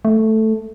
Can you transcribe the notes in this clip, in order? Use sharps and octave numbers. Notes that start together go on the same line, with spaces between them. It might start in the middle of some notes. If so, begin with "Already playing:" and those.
A3